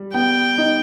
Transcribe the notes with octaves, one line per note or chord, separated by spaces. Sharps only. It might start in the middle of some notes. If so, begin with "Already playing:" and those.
Already playing: G3
B3 G5
D#4